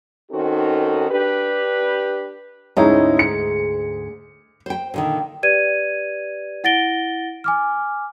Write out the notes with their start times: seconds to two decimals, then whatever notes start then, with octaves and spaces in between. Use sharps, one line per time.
0.31 D#3 C4 C#4 D#4 F#4 A4
1.10 D4 G4 B4
2.77 D2 G#2 G#3 C#4 D#4 E4
3.19 C#7
4.66 C5 G5
4.94 A#2 D3 D#3
5.43 G4 B4 D5 G#6 D#7
6.64 E4 F#5 A6 A#6 D7 G7
7.44 G#5 D6 F6